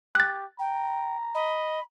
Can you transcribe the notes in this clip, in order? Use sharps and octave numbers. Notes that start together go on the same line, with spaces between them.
G4 F#6 A6
G5 A#5
D#5 B5